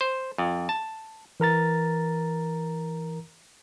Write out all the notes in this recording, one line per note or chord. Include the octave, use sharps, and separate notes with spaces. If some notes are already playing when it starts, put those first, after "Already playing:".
C5
F2
A5
E3 A#4 A#5 A6